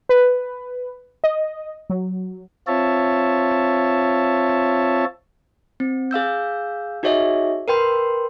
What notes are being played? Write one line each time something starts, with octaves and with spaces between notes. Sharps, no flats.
B4
D#5
F#3
C4 F4 C#5 E5 A5
C4
G#4 F5 E6 G6
D#4 F#4 G#4 C#5 D#5 E5
A#4 B4 G5 C6